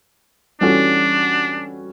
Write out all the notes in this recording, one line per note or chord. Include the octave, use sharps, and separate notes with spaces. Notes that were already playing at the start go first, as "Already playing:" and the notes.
E3 G3 C#4 D4 F#4 A4